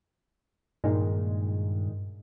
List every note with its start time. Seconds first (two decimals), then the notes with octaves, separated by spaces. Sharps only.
0.84 G2 A#2 D#3 G#3